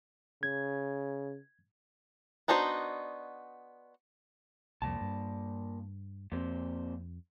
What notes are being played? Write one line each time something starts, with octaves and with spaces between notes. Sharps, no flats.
C#3 G#6
B3 D4 D#4 F#4 C5
C2 F2 A#2 A5
G2
F2 A#2 C4